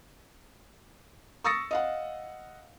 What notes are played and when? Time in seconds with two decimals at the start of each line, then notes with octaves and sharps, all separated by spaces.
1.44 C#6 D#6 E6 A6 A#6 C#7
1.71 D#5 F5 F#5